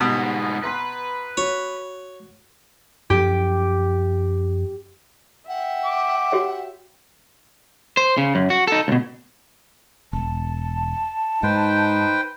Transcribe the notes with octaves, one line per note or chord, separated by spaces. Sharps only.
G#2 B2 G3 B3
B4 A#5 C6 F#6
F#4 C#5
F#2 F3 C#4 G4
E5 F#5 G5
D6
F#4 G4 C#5
C5
C#3
F#2
F#4
D#4 A4
C#2 B2
E1 A5
G#2 D#4 B4 C5 G5